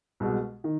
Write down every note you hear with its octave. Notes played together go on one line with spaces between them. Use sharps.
C2 B2 G#3
D#3